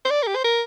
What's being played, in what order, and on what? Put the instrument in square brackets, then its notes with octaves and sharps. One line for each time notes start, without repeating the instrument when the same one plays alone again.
[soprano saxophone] C5
D5
A#4
G4
C5
A#4